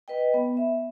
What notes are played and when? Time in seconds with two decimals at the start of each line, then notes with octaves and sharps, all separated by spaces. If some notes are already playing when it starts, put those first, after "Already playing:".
0.08 B4 D#5 G5
0.34 B3
0.57 E5